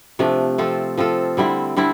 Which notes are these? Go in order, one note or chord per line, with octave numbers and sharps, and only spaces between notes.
C3 F3 A3 D4
F3 C4 F4 A4
F3 C4 F4 A4
D3 G3 C4 E4
D3 G3 C4 E4